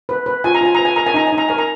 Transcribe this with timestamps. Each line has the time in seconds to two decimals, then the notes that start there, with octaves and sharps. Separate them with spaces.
0.09 B4
0.26 B4
0.44 F4 G#5
0.54 A#5
0.61 F4 G#5
0.75 B4 A#5
0.85 G#5
0.96 A#4 A#5
1.06 G#5
1.14 D#4 A#5
1.27 G#5
1.32 D#4
1.38 A#5
1.48 A#4 G#5
1.58 A#5